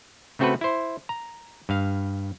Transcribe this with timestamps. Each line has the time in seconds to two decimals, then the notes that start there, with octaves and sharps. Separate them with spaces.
0.39 C#3 A3 C4 F#4 A4 B4
0.61 E4 C5
1.09 A#5
1.69 G2 F5